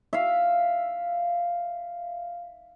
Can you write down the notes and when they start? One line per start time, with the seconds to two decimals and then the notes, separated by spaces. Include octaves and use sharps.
0.13 E5 F5